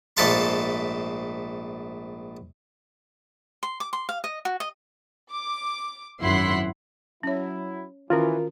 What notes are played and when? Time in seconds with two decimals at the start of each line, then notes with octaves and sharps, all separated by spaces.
0.17 A#1 G#2 A3 A4 F5 C6
3.63 C6
3.80 D6
3.93 C6
4.09 F5
4.24 D#5
4.45 F#4
4.60 D#5
5.30 D6
6.21 G#1 F#2 E4 F#5 C6 B6
7.23 F#3 C#4 E4 C#5
8.10 D#3 E3 C#4 F4 F#4 A#4